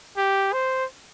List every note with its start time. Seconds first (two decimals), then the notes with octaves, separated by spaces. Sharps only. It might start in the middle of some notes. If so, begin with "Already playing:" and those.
0.17 G4
0.53 C5